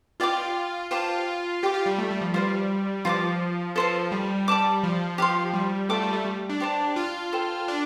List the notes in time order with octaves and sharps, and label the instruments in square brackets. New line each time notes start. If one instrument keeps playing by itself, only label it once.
[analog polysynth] F4 [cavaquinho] G4 D5 G5 D6
[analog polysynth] F4 [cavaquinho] G4 C5 A5 D6
[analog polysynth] G4 [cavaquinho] D5 G5 D6
[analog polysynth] F4
G3
A3
G3
F3
[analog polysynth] G3 [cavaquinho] F4 C5 F5
[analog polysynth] F3 [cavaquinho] F4 C5 A5 D6
[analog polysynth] F3 [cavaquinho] A4 C5 A5
[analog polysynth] G3
[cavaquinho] D5 A5 D6
[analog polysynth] F3
[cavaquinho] G4 F5 C6
[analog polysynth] G3
[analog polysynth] A3 [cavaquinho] F4 D5 A5 D6
[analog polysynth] G3
A3
G3
D4
[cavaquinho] G4 C5 A5
[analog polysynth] F4
[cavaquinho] A4 C5 G5
[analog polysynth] D4